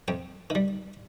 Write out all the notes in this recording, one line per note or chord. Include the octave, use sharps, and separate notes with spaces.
F2 G5
D#3 G3